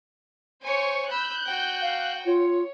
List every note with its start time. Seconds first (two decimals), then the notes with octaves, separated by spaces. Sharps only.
0.62 C5 C#5 G#5 C#6
1.10 B5 E6 F#6 G6
1.45 F#4 G5
1.82 F5
2.25 F4 C#5